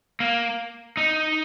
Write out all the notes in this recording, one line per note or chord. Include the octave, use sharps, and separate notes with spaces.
A#3
D#4